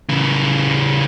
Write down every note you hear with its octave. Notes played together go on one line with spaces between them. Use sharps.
C#3 E3